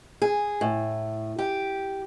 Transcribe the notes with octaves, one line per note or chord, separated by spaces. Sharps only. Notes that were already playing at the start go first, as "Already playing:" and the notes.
G#4
A2
G4